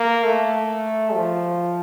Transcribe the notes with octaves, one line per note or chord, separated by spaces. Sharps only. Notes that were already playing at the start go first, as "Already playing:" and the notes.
Already playing: A#3
A3
F3